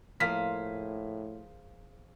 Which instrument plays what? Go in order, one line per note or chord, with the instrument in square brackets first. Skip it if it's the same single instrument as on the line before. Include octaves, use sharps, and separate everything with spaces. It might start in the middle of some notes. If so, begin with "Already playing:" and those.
[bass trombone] A2 [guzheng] F3 A#3 F4 [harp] G#4 C5 F5 [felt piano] B6